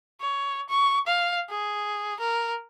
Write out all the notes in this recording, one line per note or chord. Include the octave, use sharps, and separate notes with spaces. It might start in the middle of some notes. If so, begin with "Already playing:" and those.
C#5
C#6
F5
G#4
A#4